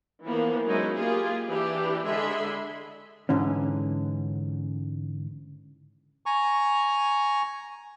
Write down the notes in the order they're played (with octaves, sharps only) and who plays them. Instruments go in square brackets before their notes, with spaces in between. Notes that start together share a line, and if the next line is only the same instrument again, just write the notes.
[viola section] E3 F3 A#3 B3
F#3 G#3 C#4 D#4 E4
A#3 F4 G4 G#4
E3 D4 G4
D3 G#3 G#4 E5 B5 C6
[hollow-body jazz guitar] G#2 D3 E3 C#4
[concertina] G#5 A#5 C#6